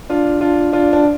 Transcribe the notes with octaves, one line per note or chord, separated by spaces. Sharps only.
D4 F4
D4 F4
D4 F4
D4